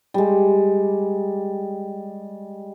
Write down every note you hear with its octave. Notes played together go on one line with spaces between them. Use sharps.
G3 G#3